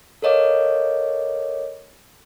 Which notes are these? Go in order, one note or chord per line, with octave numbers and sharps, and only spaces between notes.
A4 A#4 C#5 D#5 F5 D6